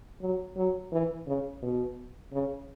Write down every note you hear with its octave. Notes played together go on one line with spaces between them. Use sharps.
F#3
F#3
E3
C#3
B2
C#3